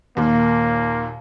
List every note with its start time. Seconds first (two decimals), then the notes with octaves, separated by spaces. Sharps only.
0.17 D#2 A#2 A#3